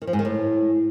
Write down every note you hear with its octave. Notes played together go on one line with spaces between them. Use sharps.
D#3
F3
G#2
D#3
A2